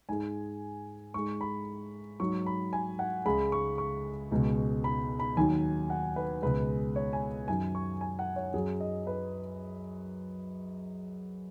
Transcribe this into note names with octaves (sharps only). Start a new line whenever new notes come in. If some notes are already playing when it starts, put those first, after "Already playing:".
G#2 G#3 G#5
G#2 G#3 C#6
B5
G#2 F#3 C#6
B5
G#5
F#5
C#2 C#3 G#3 B5
C#6
C#6
C#2 B2 G#3
B5
B5
D#2 D#3 F#3 G#5
F#5
B4
C#2 B2 G#3 B4
C#5
G#5
F#2 D#3 F#3 G#5
C#6
G#5
F#5
C#5
F#2 F#3 G#4
D#5
B4